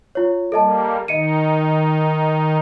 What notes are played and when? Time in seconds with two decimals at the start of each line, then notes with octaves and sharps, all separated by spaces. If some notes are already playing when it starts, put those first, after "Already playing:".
0.15 F4 C#5
0.52 G3 A#3 A4 D#5 A5
1.08 D#3 D#4 D#5 C#7 D#7